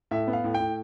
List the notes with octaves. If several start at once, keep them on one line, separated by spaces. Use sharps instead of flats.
A2 E5
B3
F5
A2
G5
A2